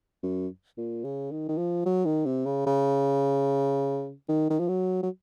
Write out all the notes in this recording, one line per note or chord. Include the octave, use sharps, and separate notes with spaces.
F#2
A#2
C#3
D#3
D#3
F3
F#3
D#3
C3
C#3
C#3
D#3
D#3
F3
F#3
F#3